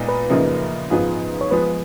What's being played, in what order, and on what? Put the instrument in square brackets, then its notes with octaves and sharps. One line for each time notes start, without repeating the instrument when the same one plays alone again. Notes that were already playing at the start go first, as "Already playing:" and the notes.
Already playing: [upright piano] A#2 G#3 B3 D#4
[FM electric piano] B4
[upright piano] F#2 C#3 F3 A#3 D#4
G#2 F3 B3 F4 G#4
[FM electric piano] C#5
[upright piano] F3 G#3 B3 [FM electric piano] B4